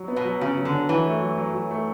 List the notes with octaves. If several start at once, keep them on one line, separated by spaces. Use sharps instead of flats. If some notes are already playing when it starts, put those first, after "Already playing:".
Already playing: F#3
B3
B2
F#3
C#3 F#3
F#3
D3
F#3
E3 F#3
A3
F#3
F#3
F#3
A3